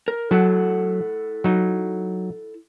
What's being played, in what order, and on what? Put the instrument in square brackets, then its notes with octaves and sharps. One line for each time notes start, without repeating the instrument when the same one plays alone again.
[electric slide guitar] A#4
[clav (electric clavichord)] F#3 [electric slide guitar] E4 A4 F#5
[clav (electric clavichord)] F#3 D#4